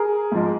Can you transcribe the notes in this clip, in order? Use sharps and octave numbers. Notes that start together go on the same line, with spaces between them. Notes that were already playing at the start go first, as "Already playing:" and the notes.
Already playing: G#4 A#4
G#2 F3 G#3